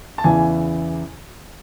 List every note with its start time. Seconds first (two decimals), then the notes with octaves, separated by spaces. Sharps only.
0.18 A5
0.24 E2 C#3 E3 G#5